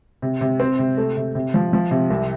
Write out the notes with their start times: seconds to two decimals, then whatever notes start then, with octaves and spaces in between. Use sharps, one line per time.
0.22 C3
0.41 C3
0.60 C4
0.79 C3
0.97 A3
1.17 C3
1.35 C3
1.54 F3
1.73 F3
1.91 C3
2.10 C2